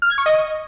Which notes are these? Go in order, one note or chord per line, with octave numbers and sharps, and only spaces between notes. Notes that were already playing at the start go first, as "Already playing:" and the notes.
F6
G#6
C#6
D#5